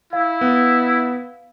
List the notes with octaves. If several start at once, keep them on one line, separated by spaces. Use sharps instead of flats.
E4 F5
B3